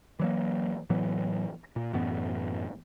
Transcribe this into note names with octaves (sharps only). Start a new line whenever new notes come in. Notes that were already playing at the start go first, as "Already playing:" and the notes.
E3 F#3 A#3
A2 E3 F#3 B3
A#2
F#2 A2 E3 B3